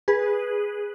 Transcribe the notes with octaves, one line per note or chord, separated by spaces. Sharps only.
G#4 B4